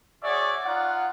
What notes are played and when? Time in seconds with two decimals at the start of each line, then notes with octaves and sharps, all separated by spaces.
0.23 F#4 G#4 C#5 D5 E5
0.65 D#4 F4 F#5